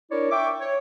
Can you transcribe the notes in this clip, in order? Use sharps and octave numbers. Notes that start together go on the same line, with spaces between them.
D4 E4 A#4 C#5 D5
E5 G5 C#6 D6
C#5